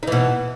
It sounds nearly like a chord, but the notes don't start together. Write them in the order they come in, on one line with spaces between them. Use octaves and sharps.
D#4 E3 B2